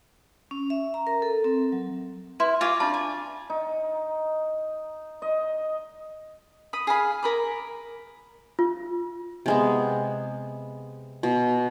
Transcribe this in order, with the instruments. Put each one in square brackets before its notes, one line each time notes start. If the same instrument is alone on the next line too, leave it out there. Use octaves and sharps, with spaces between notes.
[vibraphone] C#4
E5
A#5
A#4
A4
C4
F#3
[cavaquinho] E4 [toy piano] B4 C6
[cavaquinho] F4 G#5 D6 [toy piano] E5 F5 C#6
[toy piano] D4 F4 A5 [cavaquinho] D5
[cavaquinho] G#5
[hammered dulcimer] D#4
D#5
[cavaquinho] B5 D#6
G#4 F5 B5
A#4 B5 D6
[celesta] F4
[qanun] C3 G#3 B3
B2